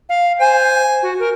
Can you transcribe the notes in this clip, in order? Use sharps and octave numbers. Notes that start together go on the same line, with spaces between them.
F5
C5 G#5
F#4
A#4